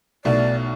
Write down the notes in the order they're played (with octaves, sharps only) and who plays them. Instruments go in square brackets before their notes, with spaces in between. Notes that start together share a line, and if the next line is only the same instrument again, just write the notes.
[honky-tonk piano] B1 B2 A3 E4 [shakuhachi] D5